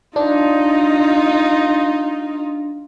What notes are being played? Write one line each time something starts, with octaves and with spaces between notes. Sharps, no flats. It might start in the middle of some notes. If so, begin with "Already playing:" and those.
D4 D#4 F4